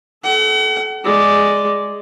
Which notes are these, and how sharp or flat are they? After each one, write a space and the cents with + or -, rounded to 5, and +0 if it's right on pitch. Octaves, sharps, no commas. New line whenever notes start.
A4 -30 F#5 +40
G#3 +0 D5 +0